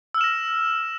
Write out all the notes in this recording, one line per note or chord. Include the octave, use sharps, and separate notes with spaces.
E6 F6 A#6 E7